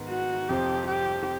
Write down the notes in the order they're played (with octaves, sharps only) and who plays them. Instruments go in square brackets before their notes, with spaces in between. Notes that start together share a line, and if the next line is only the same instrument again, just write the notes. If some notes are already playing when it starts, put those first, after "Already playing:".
Already playing: [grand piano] G#2 D#3 B3
[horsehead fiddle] F#4
[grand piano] F2 C3 F3 [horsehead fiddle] G4
[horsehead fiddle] G4